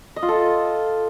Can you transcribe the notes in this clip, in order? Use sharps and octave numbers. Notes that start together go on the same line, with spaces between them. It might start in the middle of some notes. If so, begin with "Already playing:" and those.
D#5
F4
A4